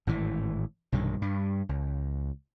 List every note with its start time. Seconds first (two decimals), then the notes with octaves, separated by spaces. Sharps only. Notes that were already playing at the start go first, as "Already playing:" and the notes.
0.07 G#1 A2 E3
0.92 B1 G2 C3 D#3
1.22 G2 G3
1.69 C#2